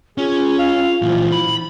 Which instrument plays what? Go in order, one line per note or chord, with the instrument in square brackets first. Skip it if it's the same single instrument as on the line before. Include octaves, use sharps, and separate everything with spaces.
[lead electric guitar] C#4 [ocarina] F4 [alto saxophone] G#4
[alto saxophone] F5
[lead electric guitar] A#2 E3 [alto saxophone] F3
[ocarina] E4 [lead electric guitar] B5